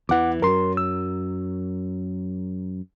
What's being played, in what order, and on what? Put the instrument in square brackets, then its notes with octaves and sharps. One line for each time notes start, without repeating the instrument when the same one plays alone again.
[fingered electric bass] E2 E3 [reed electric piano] F#5 D6
[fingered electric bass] F#2 F#3 [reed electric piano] A#4 C6
[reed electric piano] E6